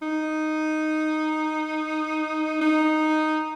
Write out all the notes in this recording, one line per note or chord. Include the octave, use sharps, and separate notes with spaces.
D#4
D#4